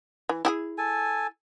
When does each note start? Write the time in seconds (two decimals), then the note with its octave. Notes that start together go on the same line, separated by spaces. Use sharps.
0.29 E3
0.45 E4 G4 G#4
0.78 A4 G#5